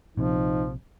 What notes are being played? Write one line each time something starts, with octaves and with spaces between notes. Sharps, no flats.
A#1 C3 F3 D#4